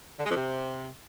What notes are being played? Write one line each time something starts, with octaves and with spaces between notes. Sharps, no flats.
D3
G#3
F2
C3